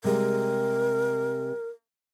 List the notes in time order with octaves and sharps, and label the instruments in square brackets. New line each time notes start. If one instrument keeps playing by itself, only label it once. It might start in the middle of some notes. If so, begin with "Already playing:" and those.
[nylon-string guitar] C3 G3 G#3 [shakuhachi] A#4